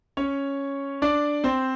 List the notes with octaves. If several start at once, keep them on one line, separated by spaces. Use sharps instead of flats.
C#4 C#5
D4 D5
C4 C5